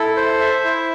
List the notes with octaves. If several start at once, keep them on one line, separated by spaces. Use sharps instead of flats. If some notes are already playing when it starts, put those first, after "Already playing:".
Already playing: E4 A4
C5
E5
E4